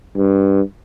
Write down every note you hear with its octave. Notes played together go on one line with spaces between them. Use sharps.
G2